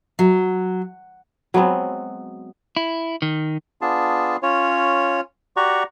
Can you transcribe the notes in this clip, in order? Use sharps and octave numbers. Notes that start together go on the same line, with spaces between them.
F#3
F#3 G#3 B3 C4
E4
D#3
B3 D4 F4 G#4 A5
C#4 F4 C#5
F#4 G4 D5 F#5 A#5 C#6